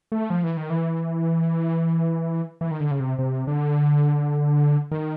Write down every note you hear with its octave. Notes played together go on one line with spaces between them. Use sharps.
A3
F3
E3
D#3
E3
E3
D#3
D3
C#3
C3
C3
D3
D#3